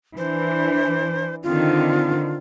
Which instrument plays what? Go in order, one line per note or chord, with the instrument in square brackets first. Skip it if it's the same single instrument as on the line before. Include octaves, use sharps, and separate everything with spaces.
[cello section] E3 D4 [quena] C5
[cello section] D3 D#3 C4 [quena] F4